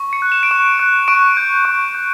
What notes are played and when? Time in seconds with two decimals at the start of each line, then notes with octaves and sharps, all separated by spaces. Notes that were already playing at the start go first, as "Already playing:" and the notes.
Already playing: C#6
0.13 C#7
0.22 F#6
0.32 E7
0.43 D7
0.51 C#6 E7
0.79 F#6
1.08 C#6 D7
1.37 G6
1.65 C#6
1.95 G6